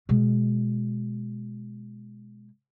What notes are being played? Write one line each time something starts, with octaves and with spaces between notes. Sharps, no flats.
B2 G#3